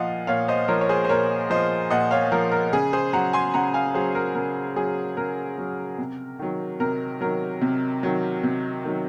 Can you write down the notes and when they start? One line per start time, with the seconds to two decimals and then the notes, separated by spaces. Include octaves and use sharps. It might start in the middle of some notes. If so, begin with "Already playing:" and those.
Already playing: A#2 F3 D#5 F5 F#5
0.27 A#2 C#5 F5
0.48 C5 D#5
0.68 F3 A#4 C#5
0.81 C#5
0.89 G#4 C5
1.04 C5
1.09 A#2 A#4 C#5
1.50 F3 C5 D#5
1.90 A#2 D#5 F#5
2.11 C#5 F5
2.32 F3 A#4
2.52 A#4
2.73 C#3 G#4
2.93 G#4 C5
3.13 F#3 F#5 A#5
3.33 G#5 C6
3.54 C#3 F#5 A#5
3.74 F5 G#5
3.94 F#3 G#4 C5
4.15 A#4
4.35 C#3 A#4
4.76 F#3 G#4
5.17 C#3 A#4
5.58 F#3
5.98 C3
6.39 D#3 F#3
6.80 C3 A#4
7.21 D#3 F#3 A#4
7.62 C3
8.03 D#3 F#3
8.44 C3
8.84 D#3 F#3